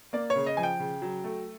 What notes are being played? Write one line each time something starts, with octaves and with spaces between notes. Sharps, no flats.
A#3 D5
C#5
C#3
D#5
F3 G#5
G5
C#3
F#3
A3